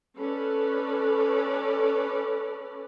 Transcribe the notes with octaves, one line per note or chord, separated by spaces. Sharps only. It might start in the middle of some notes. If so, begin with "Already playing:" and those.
C#4 A4 B4 D5